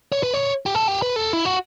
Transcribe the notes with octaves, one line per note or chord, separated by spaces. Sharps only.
C#5
B4
C#5
G4
A4
G4
B4
A4
E4
F#4